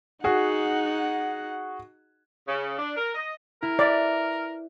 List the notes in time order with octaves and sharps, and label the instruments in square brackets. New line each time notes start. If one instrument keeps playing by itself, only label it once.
[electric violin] D#4 F#5 [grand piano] F#4 G#4
[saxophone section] C#3
D4
A#4
D#5
[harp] E4 [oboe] A#4
[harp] B4 E5 [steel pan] D5